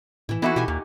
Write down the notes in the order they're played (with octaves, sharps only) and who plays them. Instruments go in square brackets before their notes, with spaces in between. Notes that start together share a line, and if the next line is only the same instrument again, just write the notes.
[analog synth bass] A2 [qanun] E3 E4
[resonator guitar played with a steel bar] E3 E4 F#4 [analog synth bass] B3 [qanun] D#4 A4
[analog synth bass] B2 [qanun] G4 F#5 G#5
[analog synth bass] D#2 [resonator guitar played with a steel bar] A#2